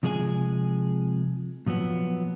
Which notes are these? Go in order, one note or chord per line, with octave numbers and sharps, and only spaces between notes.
C3 F3 G#3 G#4 C5 G#5
A#2 F3 F#3 B3